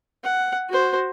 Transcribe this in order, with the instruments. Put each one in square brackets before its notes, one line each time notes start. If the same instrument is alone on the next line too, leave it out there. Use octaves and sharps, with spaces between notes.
[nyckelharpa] F#5
F#4 C5